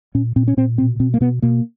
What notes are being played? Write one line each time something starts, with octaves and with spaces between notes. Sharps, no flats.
A#2 C#4
A#2 C4
C#4
A#2 C4
B2 C4
B2 C4
A#3
B2 B3
B2 A#3